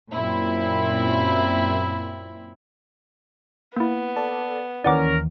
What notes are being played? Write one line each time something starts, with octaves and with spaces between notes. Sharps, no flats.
F#2 A#2 C4 E4
A#3 B3 E4
A4 D5 A5
D#2 E3 C#4 A#4 D5 F#5 D6